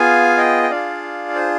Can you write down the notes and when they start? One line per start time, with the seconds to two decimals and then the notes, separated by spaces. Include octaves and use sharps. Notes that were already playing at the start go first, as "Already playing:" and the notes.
Already playing: B3 F4 G#4 F5 G#5
0.37 D#5 G5
0.63 G5
0.70 D4 F4 G#4 D5 F5
1.35 C5